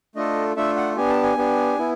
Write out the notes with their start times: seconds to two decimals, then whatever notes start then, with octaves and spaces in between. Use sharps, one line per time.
0.15 A3 D4 F4 A4 D#5
0.56 A3 D4 F4 A4 E5
0.77 F#5
0.96 B3 D4 G4 G#5
1.09 A5
1.23 G#5
1.37 B3 D4 G4
1.78 B3 E4